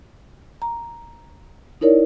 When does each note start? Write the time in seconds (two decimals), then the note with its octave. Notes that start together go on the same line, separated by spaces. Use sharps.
0.62 A#5
1.81 D#4 E4 A#4 C#5 D5